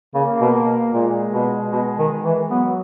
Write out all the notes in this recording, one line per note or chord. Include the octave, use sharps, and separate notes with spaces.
C#3 A#3
B2
A#2 G#3
B2
B2
D#3
E3
F#3 B3